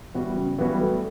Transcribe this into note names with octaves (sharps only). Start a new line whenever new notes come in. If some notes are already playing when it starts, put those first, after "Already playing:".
E3 G3 B3 F#4
C#3
E3 G3 B3 F#4
A3